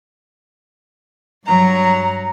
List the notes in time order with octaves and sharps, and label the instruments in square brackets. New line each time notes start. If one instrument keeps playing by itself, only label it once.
[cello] G2 F#3 [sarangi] A#5